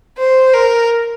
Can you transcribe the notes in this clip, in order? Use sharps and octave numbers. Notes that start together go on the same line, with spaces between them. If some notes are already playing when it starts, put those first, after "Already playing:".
C5
A#4